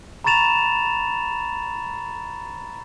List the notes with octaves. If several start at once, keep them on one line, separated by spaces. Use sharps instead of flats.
A#5 B5 C#6 A6 E7 F7